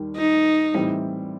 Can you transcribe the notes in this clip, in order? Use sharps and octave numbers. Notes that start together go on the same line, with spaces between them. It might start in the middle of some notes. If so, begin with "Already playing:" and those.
Already playing: D#2 D#3 G3
D#4
A2 E3 G3 C4